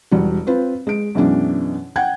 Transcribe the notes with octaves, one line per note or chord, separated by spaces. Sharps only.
E1 G3 F#4
C4 F4 B4
G#3 D7
F#2 B2 E3 G#3 C#4 D4
F#5 G5 G#6